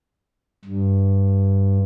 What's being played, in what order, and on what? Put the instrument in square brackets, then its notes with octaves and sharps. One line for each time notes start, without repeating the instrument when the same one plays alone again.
[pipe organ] G2